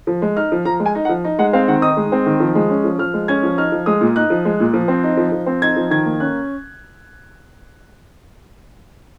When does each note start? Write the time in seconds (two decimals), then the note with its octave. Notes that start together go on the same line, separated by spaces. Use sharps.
0.07 F3
0.22 G#3
0.36 D#4 F6
0.52 F3
0.65 F3 A#5
0.80 G#3
0.86 G#5
0.95 D#4
1.05 F#5
1.09 F3
1.24 D#4
1.39 G#3 F#5
1.53 C4 F5
1.68 D#3 F#5
1.82 D#4 D#6
1.97 G#3
2.12 C4
2.26 D#3
2.40 F3
2.55 G#3
2.70 C#4
2.84 F3
2.98 F3 F6
3.14 G#3
3.28 C#4 G#6
3.43 F3
3.58 D#4 F6
3.72 F3
3.86 G#3 D#6
4.01 A#2
4.16 D#4 F#6
4.30 F3
4.45 G#3
4.60 A#2
4.74 F3
4.88 C4
5.03 D#4
5.17 F3
5.32 F3
5.46 C4
5.62 D#4 G#6
5.76 F3
5.90 D#3 G#6
6.05 A#3
6.20 C#4 F#6